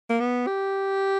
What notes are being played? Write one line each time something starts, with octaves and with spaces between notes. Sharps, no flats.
A#3
B3
G4